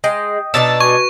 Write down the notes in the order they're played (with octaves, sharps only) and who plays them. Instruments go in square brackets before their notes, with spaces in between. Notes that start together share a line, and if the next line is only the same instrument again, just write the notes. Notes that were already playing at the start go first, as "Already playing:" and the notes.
[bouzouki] G#3 [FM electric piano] D#5 G5 [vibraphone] D#6
[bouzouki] B2 D4 D#4 [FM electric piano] E6 A6
[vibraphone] F#4 B4 [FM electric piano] G#5 [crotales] C#6